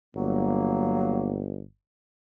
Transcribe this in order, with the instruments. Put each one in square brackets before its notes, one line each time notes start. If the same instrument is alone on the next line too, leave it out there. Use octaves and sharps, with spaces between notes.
[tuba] G1 [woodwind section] F#3 A#3